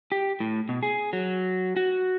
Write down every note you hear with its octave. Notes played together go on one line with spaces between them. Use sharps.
G4
A2
B2
G#4
F#3
F#4